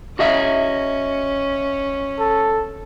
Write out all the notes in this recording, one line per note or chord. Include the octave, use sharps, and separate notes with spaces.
C#4 F#4 D#5 E5
A4